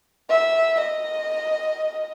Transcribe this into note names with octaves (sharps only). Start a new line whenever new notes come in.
E5
D#5